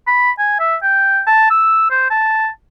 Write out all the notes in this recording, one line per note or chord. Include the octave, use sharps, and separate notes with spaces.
B5
G#5
E5
G5
A5
E6
C5
A5